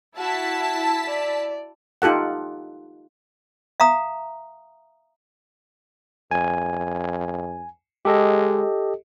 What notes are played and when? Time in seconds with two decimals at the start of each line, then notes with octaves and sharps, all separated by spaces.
0.18 E4 F#4 A5 B6
1.08 D5
2.02 D#4 F4 G4 A4 F#5
3.80 E5 F5 A#5 D#6
6.31 F2 G#5
8.05 G#3 G4 A4 D#5